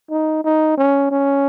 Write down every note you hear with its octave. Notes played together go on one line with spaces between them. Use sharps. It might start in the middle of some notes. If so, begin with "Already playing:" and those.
D#4
D#4
C#4
C#4